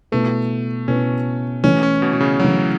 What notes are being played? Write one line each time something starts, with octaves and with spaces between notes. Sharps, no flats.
B2 A3 B3 E4 B4
B2 B3 C#4 E4 B4
E3 A3 C#4 E4 C#5
C#4
B2
B2
C#3
E3 F#3 A3 E4 C#5